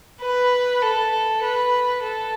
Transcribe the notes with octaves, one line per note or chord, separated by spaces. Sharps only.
B4
A4
B4
A4